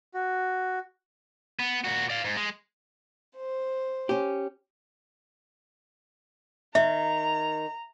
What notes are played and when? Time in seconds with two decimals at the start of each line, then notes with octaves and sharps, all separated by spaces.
0.14 F#4
1.59 B3
1.84 A#2 F#4
2.10 D5 F5
2.24 G#2
2.37 G#3
3.36 C5
4.09 C#4 G4
6.75 D#3 E5 A#5